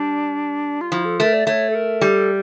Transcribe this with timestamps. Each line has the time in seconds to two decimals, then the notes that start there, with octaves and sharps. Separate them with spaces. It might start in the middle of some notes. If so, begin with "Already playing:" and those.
Already playing: G3 D4
0.81 F4
0.92 F3 E4
1.05 A4
1.20 A3 A#4
1.33 D5
1.47 A3 C#5
1.70 A4
1.75 A#4
2.01 G3 A4